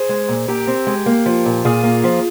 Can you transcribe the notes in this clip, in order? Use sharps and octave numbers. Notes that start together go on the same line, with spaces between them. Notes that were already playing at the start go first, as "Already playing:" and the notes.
Already playing: G#4 C5
G#3
A#2
A#2 G4 A#4
C4
G#3
A#3
F3
A#2
A#2 F4 G#4
A#3
F3